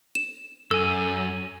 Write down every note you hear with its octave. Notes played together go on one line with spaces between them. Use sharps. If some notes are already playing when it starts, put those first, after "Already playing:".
E7
F#2 A4 G#5 E6